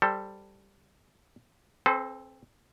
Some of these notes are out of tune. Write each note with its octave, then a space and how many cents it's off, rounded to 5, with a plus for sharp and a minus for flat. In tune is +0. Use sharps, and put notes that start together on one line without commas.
G3 +0 A4 +15 C5 +0
C4 +20 A4 -35 C5 -45